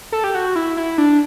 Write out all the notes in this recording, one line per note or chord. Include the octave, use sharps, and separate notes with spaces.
A4
G4
F#4
E4
E4
D4